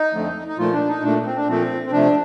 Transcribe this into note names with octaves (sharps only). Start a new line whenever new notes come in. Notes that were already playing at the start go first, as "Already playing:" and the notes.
Already playing: D#4
F2 D3 F3 A3
D#4
A#2 F3 A3 F4
D4
D#4
A#2 A3 D4
C4
D4
A#2 F3 A3 C4
C4
C3 F3 A3 D4